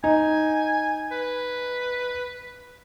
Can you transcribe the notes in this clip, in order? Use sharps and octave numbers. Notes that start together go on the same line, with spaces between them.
D#4 G#5
B4